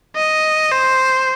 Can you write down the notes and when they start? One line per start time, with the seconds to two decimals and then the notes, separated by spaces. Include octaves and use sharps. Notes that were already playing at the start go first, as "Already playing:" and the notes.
0.16 D#5
0.72 C5